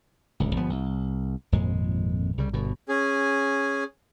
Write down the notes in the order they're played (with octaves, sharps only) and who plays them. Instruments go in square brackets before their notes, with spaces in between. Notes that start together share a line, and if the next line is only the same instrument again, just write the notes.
[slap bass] D1 C#2
G1 F3 B3
C2
G#1 F2 A#2 G#3
C2 C#3 G3
G1 B2
[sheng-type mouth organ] C#4 G#4